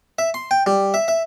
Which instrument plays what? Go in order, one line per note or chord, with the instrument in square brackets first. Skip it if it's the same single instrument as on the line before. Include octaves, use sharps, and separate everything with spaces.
[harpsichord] E5
C6
G5
G3
E5
E5